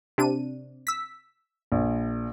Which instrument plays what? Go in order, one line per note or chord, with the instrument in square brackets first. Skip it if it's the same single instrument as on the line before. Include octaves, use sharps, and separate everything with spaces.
[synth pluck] C3 D4 D#7
E6 B6
[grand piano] A#1